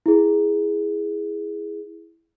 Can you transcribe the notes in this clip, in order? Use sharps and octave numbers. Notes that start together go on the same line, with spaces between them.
E4 G#4